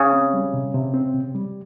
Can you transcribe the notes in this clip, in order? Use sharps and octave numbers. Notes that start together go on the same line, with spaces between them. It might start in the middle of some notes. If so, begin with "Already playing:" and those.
Already playing: C#3
C4
G3
C3
C3
C4
C3
G3